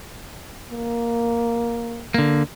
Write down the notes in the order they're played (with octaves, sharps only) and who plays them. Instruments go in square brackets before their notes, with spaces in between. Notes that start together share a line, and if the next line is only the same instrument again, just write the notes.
[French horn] A#3
[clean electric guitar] D3 A#3